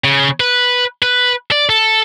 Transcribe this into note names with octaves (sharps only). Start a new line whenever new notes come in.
C#3
B4
B4
D5
A4